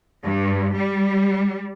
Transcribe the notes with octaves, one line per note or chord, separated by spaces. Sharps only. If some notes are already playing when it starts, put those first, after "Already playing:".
G2
G3